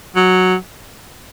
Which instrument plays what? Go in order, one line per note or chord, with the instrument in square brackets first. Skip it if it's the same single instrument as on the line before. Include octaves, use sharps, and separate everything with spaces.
[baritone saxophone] F#3